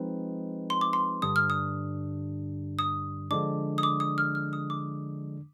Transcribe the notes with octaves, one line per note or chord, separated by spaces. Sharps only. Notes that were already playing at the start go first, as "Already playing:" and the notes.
Already playing: F3 G#3 C4 D#4 B4
C6
D6
C6
G2 D3 G3 D4 D#6
F6
D#6
D#6
D3 F3 G#3 D4 D6
D#6
D6
D#6
F6
F6
D#6
D6